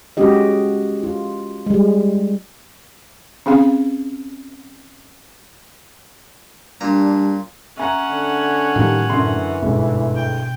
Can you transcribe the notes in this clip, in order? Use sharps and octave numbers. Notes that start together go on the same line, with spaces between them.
G#3 C#4 F#4 G4 D#5
F4
G3 G#3
C4 C#4 G#4 F5
A#2 G3 D4 A#5
C#4 E5 F#5 G#5 A#5
D3
A2 D#3 F3 G3 A3
F#2 D3 E3 C6
G1 G#2 B2
G5